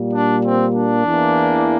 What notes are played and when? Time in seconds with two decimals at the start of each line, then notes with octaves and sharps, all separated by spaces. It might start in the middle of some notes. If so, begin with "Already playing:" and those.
Already playing: A#2 G3 A#3
0.14 D4
0.44 C4
0.75 D4
1.05 E2 E3 A#3